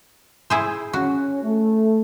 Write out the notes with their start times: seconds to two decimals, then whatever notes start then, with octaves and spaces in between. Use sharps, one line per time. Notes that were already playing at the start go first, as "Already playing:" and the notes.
0.50 E4 G#4 C5
0.93 C#4 F#4
1.43 A3